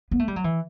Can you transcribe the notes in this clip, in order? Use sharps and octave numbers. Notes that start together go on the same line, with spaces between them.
B3
A3
G3
F#3
E3